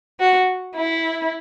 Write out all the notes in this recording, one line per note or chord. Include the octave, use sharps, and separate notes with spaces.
F#4
E4